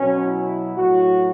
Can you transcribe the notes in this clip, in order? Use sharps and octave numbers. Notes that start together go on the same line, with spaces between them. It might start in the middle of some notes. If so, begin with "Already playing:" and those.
Already playing: B2 F#3 C#4
E4
A2 F#3 F#4